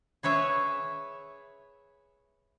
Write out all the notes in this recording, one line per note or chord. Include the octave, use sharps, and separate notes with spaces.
G#4 B4 C#5 E5